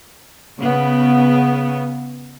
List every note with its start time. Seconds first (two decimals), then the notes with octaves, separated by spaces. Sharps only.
0.61 C#3 B3